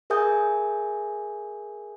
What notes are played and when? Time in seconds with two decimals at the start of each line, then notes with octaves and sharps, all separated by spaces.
0.10 G#4 A#4 E5 G#5 D#6 G6